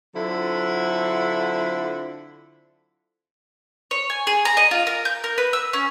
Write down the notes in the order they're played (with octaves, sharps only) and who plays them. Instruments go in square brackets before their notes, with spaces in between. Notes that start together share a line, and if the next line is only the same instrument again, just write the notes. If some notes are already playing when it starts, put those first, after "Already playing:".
[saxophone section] D3 F#3 C4 E4 F4 A4
[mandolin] C#5
G#5
G#4
A#5
D#5
F4
A#4
G6
A#4
B4
E6
C#4